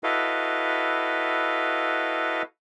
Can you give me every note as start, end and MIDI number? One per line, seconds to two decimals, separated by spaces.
0.03 2.42 64
0.03 2.42 66
0.03 2.42 69
0.03 2.42 71
0.03 2.42 75
0.03 2.42 77